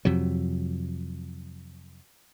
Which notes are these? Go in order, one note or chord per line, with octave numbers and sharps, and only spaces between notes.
F2 C3 F#3